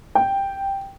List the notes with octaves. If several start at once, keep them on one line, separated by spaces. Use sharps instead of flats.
G5